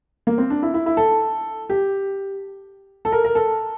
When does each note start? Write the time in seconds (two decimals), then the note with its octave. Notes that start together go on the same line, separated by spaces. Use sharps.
0.27 A#3
0.38 C4
0.50 D4
0.63 E4
0.74 E4
0.86 E4
0.97 A4
1.70 G4
3.05 A4
3.12 A#4
3.25 A#4
3.35 A4